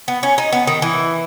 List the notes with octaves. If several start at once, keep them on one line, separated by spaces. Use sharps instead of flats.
B3
C#4
D#4
B3
D#3
E3